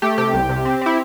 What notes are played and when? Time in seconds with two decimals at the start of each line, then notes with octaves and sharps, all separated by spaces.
0.02 A3 G4
0.18 C3 G4
0.34 C2
0.49 C3
0.65 C4
0.81 C4 E4